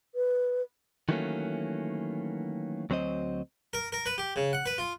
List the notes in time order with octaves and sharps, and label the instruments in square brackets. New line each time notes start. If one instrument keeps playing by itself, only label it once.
[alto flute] B4
[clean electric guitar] D#3 E3 F#3 A3 A#3 C#4
D2 F#3 C4 C5 D#5
[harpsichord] A#4
A#4
B4
G4
C#3
F#5
B4
F4